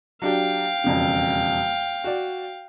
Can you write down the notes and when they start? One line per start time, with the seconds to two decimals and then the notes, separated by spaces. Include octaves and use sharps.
0.22 F#3 D4 G4 F5 G5
0.84 E1 F2 C#3
2.04 F#4 D5